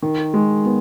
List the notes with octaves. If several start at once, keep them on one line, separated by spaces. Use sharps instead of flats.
D#3
G#3
B3